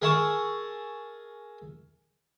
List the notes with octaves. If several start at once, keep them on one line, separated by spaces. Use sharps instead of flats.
G#4 A#4 E5 A5 C#6